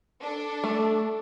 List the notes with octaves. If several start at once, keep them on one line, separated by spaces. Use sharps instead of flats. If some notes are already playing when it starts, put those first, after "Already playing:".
D4 A4
A3